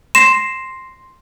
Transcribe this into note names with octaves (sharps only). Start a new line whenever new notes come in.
C6 A#6 C7 E7